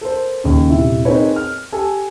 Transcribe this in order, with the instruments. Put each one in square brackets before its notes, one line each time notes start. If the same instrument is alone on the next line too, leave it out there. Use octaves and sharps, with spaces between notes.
[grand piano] A4 A#4 C5
D#2 C#3
D#1 C3 E4 E5
C4 D#4 G#4 A#4 B4 C#5
F6
G4 A4 G#5